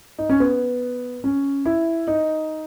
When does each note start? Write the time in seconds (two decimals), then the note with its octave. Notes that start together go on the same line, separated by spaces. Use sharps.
0.18 D#4
0.29 C#4
0.40 B3
1.24 C#4
1.66 E4
2.08 D#4